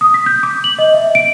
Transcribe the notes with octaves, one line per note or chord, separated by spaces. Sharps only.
D#6
B6
G6
D6
F#7
D#5
E5
D7